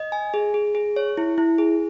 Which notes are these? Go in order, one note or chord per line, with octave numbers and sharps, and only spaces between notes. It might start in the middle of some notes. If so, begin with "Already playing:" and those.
Already playing: D#5
G#5
G#4
G#4
G#4
C#5
E4
E4
G#4